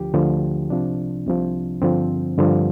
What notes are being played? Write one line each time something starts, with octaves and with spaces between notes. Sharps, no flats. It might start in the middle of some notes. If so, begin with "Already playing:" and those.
Already playing: D2 D3 F3 G4
D2 D3 F3
C2 C3 F3 D4
C2 C3 F3
G2 D3 F3 C4
G2 D3 F3